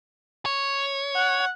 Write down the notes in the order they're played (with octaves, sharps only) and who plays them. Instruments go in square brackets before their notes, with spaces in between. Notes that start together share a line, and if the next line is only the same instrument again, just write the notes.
[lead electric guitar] C#5
[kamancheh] F#5